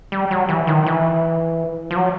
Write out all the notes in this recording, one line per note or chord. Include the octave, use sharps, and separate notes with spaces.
G3
F#3
E3
D#3
E3
F3
F#3